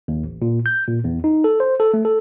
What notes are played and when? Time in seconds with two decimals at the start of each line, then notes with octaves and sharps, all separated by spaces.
0.08 D#2
0.23 A1
0.42 A#2
0.66 G6
0.88 A#2
1.04 E2
1.24 D#4
1.44 A4
1.60 C5
1.80 A4
1.94 A3
2.05 A4